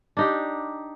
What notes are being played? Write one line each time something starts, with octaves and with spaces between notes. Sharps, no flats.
D4 D#4 G4